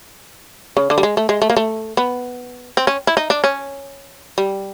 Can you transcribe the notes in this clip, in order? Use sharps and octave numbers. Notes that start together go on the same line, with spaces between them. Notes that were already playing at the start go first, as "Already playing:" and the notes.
C#3
D3
G3
G#3
A3
G#3
A3
A#3
A3
B3
C4
C#4
E4
D#4
D4
C#4
G3